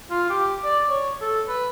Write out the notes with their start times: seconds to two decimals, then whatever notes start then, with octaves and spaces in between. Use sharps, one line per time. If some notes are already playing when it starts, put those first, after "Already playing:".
0.10 F4
0.30 G4
0.64 D5
0.90 C#5
1.21 A4
1.48 B4